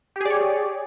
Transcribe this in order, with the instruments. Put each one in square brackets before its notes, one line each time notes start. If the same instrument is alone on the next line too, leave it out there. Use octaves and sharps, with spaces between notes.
[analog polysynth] G4
G#4
D5
C#5